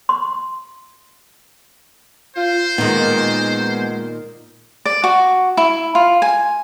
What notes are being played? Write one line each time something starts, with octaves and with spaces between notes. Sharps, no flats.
C6
F4 C5
A#2 D#3 G#3 B3 D#4
D5
F#4
E4
F4
G#5